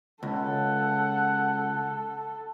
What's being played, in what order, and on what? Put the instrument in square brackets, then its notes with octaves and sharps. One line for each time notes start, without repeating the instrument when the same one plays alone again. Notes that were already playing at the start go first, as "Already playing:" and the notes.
[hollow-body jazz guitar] C#2 [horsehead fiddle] A4 [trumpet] F#5